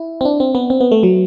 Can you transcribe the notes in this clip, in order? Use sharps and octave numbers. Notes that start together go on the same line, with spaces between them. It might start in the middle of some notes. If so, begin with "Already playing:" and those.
Already playing: E4
C4
D4
C4
B3
C4
B3
A3
F#3